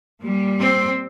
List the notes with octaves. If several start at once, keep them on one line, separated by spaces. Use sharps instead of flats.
A#2 G3
C4